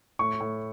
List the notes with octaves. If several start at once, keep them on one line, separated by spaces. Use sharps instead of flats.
A2 C#6
A2